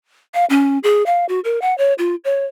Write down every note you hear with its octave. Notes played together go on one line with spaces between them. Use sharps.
F5
C#4
G#4
F5
F#4
A#4
F#5
C#5
F4
C#5